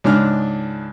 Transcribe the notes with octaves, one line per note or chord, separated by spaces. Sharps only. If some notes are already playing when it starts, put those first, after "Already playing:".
C#2 G#2 D4 F6